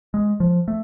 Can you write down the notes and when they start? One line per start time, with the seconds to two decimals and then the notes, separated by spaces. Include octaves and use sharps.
0.14 G#3
0.40 F3
0.68 A3